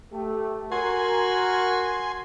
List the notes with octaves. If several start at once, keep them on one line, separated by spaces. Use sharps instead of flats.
A3 G4
F#4 A#4 G#5 C6